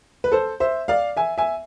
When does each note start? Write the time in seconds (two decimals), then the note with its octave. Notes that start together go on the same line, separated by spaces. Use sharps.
0.24 B4
0.32 A4 C5
0.60 C5 E5
0.88 D5 F5
1.17 E5 G#5
1.38 E5 G#5